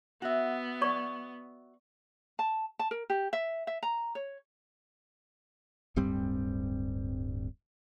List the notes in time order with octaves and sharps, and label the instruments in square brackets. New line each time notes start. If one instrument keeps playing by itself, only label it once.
[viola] B3 [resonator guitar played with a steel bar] F#4 E5
[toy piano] D5 C#6
[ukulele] A5
A5
A#4
G4
E5
E5
A#5
C#5
[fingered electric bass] D1 G2 G3 C4